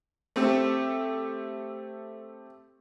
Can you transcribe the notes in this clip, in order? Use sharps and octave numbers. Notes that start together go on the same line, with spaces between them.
A3 C4 G4 A4